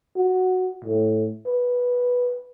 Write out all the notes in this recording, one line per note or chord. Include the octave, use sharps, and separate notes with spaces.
F#4
A2
B4